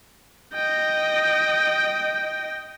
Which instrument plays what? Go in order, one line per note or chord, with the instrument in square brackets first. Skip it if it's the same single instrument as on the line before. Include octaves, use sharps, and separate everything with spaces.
[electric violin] D#5 G5